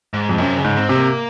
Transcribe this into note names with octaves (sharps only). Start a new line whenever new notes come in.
G#2
F2
F#2 C3
C#3
G#2
C4
C3
A#3